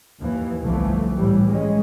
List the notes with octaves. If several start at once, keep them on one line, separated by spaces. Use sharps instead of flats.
D#2 E3
G1 C2 E3 F3 A3
A2 E3 G3
G#3 C#4